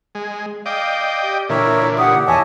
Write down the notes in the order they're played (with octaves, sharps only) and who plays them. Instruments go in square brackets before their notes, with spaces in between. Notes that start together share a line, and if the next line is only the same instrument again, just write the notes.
[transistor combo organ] G#3
[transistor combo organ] D5 D#5 G5 [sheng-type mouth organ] F5
[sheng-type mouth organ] G4
[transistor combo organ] A#2 D3 E3 [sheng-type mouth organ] A#4 C#5 E5
[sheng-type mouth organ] G4 [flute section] F#5 D#6
[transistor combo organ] E2 [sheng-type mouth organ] C#5 D#5 E5 [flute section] G#5 A5 D6